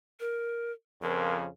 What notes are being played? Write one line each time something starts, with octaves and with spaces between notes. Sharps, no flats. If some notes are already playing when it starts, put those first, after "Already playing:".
A#4
F2 C#3 F3 A#4